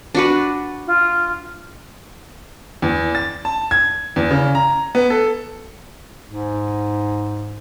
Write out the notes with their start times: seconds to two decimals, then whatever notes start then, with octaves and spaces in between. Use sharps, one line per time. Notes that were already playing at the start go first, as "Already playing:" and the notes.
0.15 D4 F#4 B4
0.87 F4
2.82 E2
3.15 A6
3.45 A5
3.71 G#6
4.16 E2
4.31 C#3
4.55 A#5
4.95 B3
5.10 A4
6.27 G#2